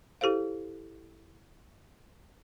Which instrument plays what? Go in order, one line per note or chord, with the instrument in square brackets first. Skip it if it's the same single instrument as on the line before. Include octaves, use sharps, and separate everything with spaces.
[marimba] E4 G4 A4 C5 F5